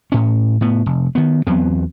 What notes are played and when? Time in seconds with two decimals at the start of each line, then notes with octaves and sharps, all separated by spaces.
0.12 A2 C#4
0.61 A2 B3
0.86 F1
1.15 D#3 B3
1.47 E2 F#3 B3 C4